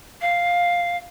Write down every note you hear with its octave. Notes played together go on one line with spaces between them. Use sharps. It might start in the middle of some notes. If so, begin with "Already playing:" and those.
F5